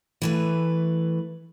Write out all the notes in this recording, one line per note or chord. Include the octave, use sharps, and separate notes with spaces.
E3 A3 B4